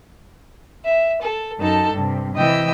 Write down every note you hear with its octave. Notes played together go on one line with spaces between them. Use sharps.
E5
A4
F#2 D#4 A4 A5
G2 C3
C3 E3 D#5 G5 E6